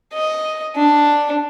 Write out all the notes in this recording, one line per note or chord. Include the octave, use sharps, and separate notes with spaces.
D#5
D4